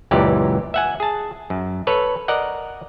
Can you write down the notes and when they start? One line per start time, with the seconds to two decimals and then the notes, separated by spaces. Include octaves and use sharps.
0.11 C#2 F#2 A#2 E3 G4 D5
0.74 E5 F#5 G#5
1.00 G#4 A5
1.50 F#2
1.87 A4 B4 C#5
2.28 A#4 D5 D#5 F#5